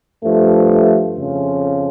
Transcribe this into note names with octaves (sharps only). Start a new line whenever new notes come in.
G2 F3 A3
F2 C#3 F3 C#4 F4